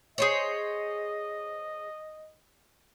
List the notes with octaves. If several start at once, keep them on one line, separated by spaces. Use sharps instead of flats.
G#4 C5 C#5 D#5